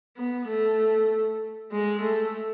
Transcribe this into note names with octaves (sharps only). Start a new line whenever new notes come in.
B3
A3
G#3
A3